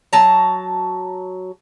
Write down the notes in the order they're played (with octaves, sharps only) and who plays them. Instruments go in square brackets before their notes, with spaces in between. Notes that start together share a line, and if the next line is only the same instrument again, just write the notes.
[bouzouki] F#3 A5 A#5